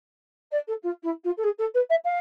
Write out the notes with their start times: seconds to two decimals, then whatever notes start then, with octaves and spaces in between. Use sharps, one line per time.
0.51 D5
0.67 A4
0.82 F4
1.03 E4
1.24 F4
1.37 A4
1.43 G#4
1.58 A4
1.74 B4
1.89 E5
2.04 F5